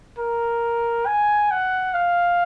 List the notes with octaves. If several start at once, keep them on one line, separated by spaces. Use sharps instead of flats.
A#4
G#5
F#5
F5